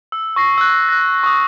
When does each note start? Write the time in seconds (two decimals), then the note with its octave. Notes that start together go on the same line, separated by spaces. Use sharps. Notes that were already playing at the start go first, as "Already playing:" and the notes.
0.12 E6
0.36 C#6 A#6 C7
0.58 E6 F#6
0.89 F#6 A#6
1.24 C#6 D#6